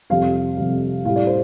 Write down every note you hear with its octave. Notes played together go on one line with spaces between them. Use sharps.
F2 C3 G3 F5
F2 C3 G3
A2 G3 F5
D5
C5